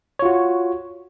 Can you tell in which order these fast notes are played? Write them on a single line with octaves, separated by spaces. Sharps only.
C#5 F4 F#4